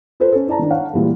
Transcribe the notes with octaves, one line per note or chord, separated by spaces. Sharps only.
F4 A4 B4 C5
C#4 A4
E4 D5 A5 A#5
D#3 D4
C#5 F5 F#5
A#2 E3 G3 G#3